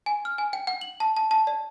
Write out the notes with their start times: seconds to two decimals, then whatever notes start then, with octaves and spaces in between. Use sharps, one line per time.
0.06 G#5
0.25 F6
0.38 G#5
0.53 G5
0.67 F#5
0.81 F#7
1.00 A5
1.17 A5
1.31 A5
1.47 D5